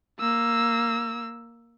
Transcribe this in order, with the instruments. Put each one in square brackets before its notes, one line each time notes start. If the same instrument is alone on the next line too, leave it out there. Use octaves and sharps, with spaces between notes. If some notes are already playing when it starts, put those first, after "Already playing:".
[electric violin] A#3 E6